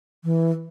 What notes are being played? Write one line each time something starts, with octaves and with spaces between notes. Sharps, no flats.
E3